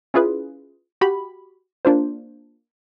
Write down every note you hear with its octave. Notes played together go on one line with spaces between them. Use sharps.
C#4 E4 F4 G#4 B4
F#4 G4 B5
A#3 D4 F4 C5